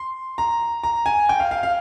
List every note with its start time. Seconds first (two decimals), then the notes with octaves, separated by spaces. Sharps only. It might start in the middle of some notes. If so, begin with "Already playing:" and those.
Already playing: C6
0.38 A#5
0.83 A#5
1.06 G#5
1.29 G5
1.40 F5
1.51 F5
1.63 F5